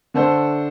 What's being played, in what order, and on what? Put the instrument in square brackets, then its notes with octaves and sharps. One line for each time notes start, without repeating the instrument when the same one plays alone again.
[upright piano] D3 A3 D4 A4 C5